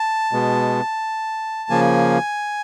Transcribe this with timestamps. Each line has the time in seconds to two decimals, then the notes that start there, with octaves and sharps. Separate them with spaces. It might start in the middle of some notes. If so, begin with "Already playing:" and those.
Already playing: A5
0.33 B2 G#3 B3
1.70 C#3 F3 A#3 G#5